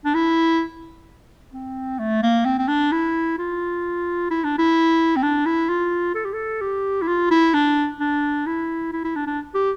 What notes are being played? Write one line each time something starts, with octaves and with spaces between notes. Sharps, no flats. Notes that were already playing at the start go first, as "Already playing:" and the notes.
D4
E4
C4
A3
A#3
C4
C4
D4
E4
F4
E4
D4
E4
C4
D4
E4
F4
A4
G4
A4
G4
E4
F4
E4
D4
D4
E4
E4
E4
D4
D4
G4